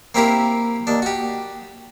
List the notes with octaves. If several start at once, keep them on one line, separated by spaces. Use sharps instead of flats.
A#3 C4 E4 G4 A#4
D#2 D4
F#4 G4